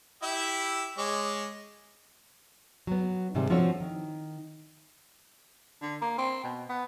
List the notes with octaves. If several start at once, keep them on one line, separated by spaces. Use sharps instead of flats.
E4 G4 E5
G#3 C#5 D6
F#3 B3
G#2 C3 D#3 G3 C4
F3 C4 D4 F#4 A4 C#5
D#3
D3
A#3
C4
B2
B3